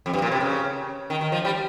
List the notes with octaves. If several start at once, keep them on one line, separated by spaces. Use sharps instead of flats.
F2
G2
A#2
C3
C#3
D#3
D#3
F3
G3